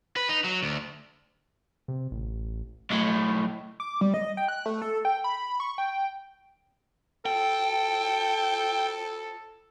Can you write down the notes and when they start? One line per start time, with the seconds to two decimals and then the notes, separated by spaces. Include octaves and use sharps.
0.16 B4
0.29 D#4
0.44 F#3
0.63 D2
1.88 C3
2.11 A1
2.90 B1 A2
3.80 D6
4.01 G3
4.14 D#5
4.37 G5
4.48 F#6
4.66 A3
4.82 A4
5.05 G5
5.24 B5
5.60 C#6
5.78 G5
7.26 A4 G5